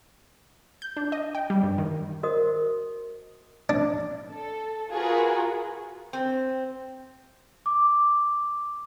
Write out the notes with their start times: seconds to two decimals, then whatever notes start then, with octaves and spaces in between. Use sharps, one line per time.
0.82 G6
0.97 D4
1.12 D#5
1.35 G5
1.50 G3
1.63 G2
1.78 D#3
2.23 F#4 A#4 C5 D#5 D#6
3.69 D4
4.31 A4
4.91 F4 F#4 G#4 A#4 B4
6.13 C4
7.66 D6